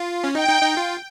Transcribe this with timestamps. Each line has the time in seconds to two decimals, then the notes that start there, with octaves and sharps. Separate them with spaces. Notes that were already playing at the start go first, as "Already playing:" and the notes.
Already playing: F4
0.24 C#4
0.34 D#4 G5
0.49 D#4
0.62 D#4
0.77 F4